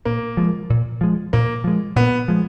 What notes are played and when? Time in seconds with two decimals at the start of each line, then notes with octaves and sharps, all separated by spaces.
0.05 A#2 A#3
0.37 F3 G#3
0.70 A#2
1.01 F3 G#3
1.33 A#2 A#3
1.64 F3 G#3
1.96 A#2 B3
2.28 F3 G#3